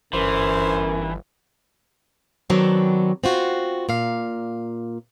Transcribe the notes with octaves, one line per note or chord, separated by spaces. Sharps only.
G1 F#2 E3 C5
D#3 F#3 B3 C4 D4
C4 F4 F#4
A#2 F5